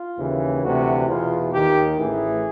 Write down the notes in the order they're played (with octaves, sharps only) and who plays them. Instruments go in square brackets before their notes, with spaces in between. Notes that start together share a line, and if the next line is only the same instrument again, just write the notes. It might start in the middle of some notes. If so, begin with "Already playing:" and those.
Already playing: [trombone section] F4
D#2 C#3 E3
D2 C3 E3 F#4
E2 B2 F4
D#2 D#3 G4
A1 A2 E3 G#4